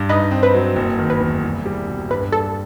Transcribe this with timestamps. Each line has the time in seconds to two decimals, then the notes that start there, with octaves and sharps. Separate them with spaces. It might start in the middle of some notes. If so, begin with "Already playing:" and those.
Already playing: G2
0.09 D#4 B4 D#5
0.31 C4
0.43 B4
0.54 F#3
0.76 F#1
0.99 D#3
1.10 B4
1.21 E2
1.44 C2
1.66 G3
1.88 B2
2.10 G2 B4
2.32 G3 A4